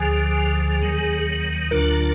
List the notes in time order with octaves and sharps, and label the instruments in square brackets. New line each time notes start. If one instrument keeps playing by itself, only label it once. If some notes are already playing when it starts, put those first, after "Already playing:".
Already playing: [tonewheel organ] D2 D3 F3 [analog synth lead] G#4
[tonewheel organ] D#2 D#3 F#3
[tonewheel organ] D2 D3 F#3 D4 F4 [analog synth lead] A#4